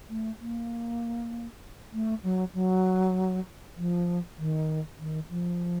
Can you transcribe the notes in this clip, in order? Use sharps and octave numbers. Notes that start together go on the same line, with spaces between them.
A3
A#3
A3
F#3
F#3
F3
D#3
D#3
F3